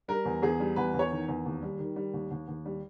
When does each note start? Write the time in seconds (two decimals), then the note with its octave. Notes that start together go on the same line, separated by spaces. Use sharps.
0.08 G3 A#4
0.25 E2
0.42 E2 G#4
0.60 G3
0.76 E2 B4
0.94 E2
0.99 C#5
1.11 D#3
1.28 E2
1.46 D#2
1.62 G3
1.79 D#3
1.96 G3
2.14 D#2
2.31 D#2
2.48 D#2
2.65 G3